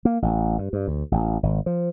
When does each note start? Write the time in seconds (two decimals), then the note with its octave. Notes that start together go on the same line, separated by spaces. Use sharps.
0.05 A#3
0.22 A1
0.58 G2
0.73 G2
0.88 D2
1.12 A1
1.43 G#1
1.66 F3